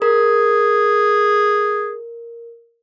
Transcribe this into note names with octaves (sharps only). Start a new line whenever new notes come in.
G#4 A#4